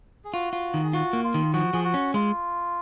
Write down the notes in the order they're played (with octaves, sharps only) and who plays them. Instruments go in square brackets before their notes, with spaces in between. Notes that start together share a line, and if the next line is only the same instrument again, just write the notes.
[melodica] G#4
[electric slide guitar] F4 [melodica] F#4
[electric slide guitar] F4
D#3
[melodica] G#4
[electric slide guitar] F4 [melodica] F#4
[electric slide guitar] A#3
[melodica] F4
[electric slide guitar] D#3
[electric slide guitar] F3 [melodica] F#4
[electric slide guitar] F3 [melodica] G#4
[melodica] F#4
[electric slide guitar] C#4
[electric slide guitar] G#3 [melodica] F4